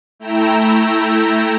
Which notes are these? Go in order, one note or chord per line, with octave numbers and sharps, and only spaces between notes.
A3 E4 G5 A#5 E6